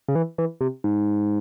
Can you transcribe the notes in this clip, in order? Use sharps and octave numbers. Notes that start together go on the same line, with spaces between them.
C#3
E3
E3
C3
G#2